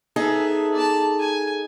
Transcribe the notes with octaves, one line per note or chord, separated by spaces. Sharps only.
B3 D#4 G#4 A4 E5
D5 A5
G#5